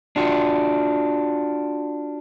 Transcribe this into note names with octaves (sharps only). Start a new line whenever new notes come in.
D4 F4 F#4